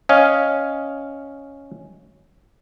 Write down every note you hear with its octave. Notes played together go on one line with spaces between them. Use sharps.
C#4 D#5 F5